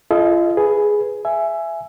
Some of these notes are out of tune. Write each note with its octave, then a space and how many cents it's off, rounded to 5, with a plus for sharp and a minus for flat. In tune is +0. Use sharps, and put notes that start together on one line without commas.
F4 -35 A4 -40 D#5 +0
G#4 +5 B4 +0
E5 +15 G#5 +10